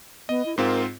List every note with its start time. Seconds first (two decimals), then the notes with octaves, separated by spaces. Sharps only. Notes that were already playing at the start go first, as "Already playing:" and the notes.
0.29 B3 D#5
0.46 E4
0.58 G#2 C4 F4 A#4